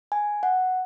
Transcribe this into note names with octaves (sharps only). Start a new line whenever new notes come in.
G#5
F#5